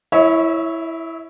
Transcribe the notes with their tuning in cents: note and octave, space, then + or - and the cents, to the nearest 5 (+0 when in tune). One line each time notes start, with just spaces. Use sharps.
E4 +0 C#5 +0 E5 -40